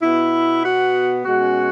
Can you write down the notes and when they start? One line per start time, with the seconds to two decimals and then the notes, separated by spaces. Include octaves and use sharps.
0.02 B2 B3 E4
0.64 F#4
1.25 B2 G#3 C#4 F#4